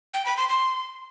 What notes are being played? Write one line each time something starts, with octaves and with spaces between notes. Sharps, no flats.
G5
B5
C6
C6